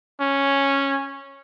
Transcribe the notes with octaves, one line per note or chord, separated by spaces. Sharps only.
C#4